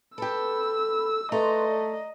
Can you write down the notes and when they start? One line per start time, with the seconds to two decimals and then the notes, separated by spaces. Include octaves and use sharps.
0.18 G4 A4 B4 B5 E6
1.32 A3 B4 D5 D#5 A#5 C6
1.68 D5